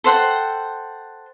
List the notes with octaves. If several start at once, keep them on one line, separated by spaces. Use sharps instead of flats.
A4 C5 F#5 G5